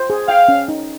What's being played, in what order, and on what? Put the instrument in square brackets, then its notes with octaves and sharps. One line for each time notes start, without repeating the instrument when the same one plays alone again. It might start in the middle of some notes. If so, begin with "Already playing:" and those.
Already playing: [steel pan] C5
G#4
[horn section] F5 [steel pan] G5
[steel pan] C#4
D#4